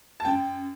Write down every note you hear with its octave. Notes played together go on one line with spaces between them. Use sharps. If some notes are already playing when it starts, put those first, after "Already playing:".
A5
F#2 G5